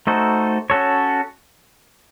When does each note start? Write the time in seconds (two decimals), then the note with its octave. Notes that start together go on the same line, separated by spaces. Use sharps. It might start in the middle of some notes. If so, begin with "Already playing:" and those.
0.07 A3 D#4 F#4 A4 C5
0.70 C#4 F#4 A4 C#5